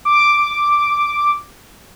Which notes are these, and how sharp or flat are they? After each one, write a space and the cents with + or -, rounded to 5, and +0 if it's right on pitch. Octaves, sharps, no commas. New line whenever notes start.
D6 +0